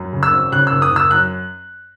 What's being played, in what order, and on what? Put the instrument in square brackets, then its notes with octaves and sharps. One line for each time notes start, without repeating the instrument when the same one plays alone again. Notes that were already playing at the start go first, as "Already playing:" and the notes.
Already playing: [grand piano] F#2
C#3
E6
G#1
C#3 F#6
F#1 E6
D#6
F#1 E6
F#2 F#6